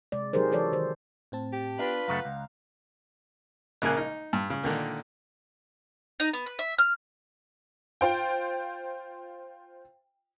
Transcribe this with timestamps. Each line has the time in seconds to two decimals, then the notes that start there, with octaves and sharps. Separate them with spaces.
0.12 C3 G#3 D5
0.33 F#3 D#4 G4 G#4 A#4 C5
0.52 E3 F#3 A4 C#5 D5
0.73 D#3 C5
1.32 A2 C4 A5
1.53 G4
1.79 B3 D4 F4 B4
2.08 F#2 C#3 A3 F5 F#5 A#5
2.25 C#2
3.82 A#1 C#3 A#3 G#5 F#6
3.97 D#4
4.33 G2
4.50 C#3
4.63 A#2 D3 D#3 A#3
6.20 D#4
6.33 B3
6.46 B4
6.59 E5
6.78 F6
8.01 F4 C5 G5